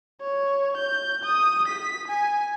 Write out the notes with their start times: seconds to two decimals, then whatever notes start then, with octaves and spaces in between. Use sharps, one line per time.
0.21 C#5
0.76 G6
1.23 D#6
1.67 B6
2.07 G#5